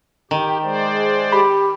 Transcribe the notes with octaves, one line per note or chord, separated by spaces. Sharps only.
D#3 G4
G#3 C5 D5
G4 B5